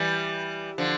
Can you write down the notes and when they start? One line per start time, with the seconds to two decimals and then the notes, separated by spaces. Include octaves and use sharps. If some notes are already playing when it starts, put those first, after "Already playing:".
Already playing: E3 G3
0.78 D3 F3